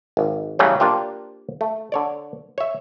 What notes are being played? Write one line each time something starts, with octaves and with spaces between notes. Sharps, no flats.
G#1
C#3 E3 F#3 G3 A3
A#3 D4 F4 G4 C5
A3
D3 C#5 D5
C#5 E5